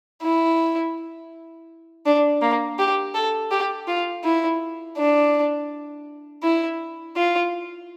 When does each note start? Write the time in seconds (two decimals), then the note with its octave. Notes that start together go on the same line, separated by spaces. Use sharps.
0.23 E4
2.06 D4
2.42 A#3
2.79 G4
3.15 A4
3.51 G4
3.88 F4
4.24 E4
4.98 D4
6.43 E4
7.16 F4